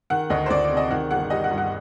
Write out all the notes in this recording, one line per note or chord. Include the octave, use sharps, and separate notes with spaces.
D#3 F#5
D2 D#5
C5
D2 D5
D5
C3
D#5
D#3 F#5
G1 F#5
G3 D#5
F#5
G2
F#5